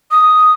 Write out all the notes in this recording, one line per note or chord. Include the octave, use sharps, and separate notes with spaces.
D#6